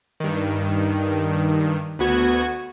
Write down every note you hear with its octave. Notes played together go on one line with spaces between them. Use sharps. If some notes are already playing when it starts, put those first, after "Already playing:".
G2 D#3
D2 B3 F#4 G#6